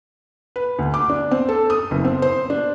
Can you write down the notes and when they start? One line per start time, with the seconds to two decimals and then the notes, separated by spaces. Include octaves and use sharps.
0.56 B4
0.79 D2
0.94 D6
1.10 D4
1.31 C4
1.49 A4
1.70 D#6
1.91 F#1
2.05 C4
2.22 C5
2.50 D4